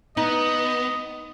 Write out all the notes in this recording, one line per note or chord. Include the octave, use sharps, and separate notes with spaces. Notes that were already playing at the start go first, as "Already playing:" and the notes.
B3 D#4 D#5